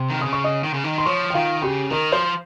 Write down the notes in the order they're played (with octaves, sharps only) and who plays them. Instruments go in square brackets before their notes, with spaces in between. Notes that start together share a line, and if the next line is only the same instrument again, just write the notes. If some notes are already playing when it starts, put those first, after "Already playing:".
Already playing: [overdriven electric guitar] C3
D#3
[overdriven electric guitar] C#3 [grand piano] D#6
[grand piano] C#6
D#5 D#6
[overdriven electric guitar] D#3
C#3
D#3
[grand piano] C6
[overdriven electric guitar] F3 [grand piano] C#5 C#6
[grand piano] G5
[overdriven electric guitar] D#3 [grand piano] F4 F5
[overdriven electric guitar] C#3 [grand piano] G4 G5
[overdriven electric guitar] D#3 [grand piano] A#4 A#5
[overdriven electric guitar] F3 [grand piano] C5 C6